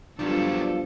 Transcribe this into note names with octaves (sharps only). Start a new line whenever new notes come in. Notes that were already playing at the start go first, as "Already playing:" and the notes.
G2 F3 F#3 B3 D4 F4 G4 A4